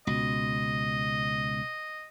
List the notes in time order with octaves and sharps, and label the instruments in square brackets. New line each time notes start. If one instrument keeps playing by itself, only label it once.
[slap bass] C#2 [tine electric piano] B2 [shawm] D#5